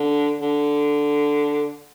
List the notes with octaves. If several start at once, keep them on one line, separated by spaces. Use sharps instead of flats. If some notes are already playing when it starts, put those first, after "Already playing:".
Already playing: D3
D3